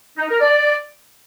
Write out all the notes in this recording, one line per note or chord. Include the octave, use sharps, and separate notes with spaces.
D#4
A#4
D5